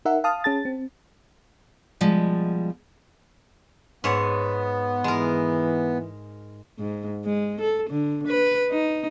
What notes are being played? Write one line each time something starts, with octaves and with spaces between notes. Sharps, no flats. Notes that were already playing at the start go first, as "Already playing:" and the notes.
D#4 A#4 E5 F#5
F5 A5 D#6 F6
C#4 G#4 A5 A6
C4
B2 F3 G3 G#3
G#2 G#3 B3 C#5
E3 G#3 A#4
G#2
G#3
A4
D3
B4
D#4